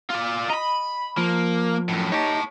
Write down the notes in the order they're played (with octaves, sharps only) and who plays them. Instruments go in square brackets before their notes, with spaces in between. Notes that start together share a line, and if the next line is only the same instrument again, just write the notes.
[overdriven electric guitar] F4 D5
[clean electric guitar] D#5 [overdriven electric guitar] A#5 B5
[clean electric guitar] F3 [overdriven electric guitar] A#3
[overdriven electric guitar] F#2 A2
[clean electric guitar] D#4 G4 [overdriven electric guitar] C#5 A5